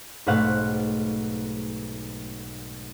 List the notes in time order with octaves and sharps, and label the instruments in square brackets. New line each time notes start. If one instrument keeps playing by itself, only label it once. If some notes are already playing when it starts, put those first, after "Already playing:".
[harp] B1 G#2 A3 B4 F5 F#5